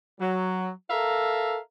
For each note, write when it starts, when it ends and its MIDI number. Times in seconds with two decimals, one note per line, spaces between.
0.20 0.70 54
0.90 1.59 69
0.90 1.59 70
0.90 1.59 76
0.90 1.59 77
0.90 1.59 82